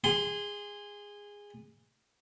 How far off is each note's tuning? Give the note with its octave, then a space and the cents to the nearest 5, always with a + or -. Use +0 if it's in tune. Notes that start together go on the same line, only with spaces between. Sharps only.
G#4 -15 C6 +0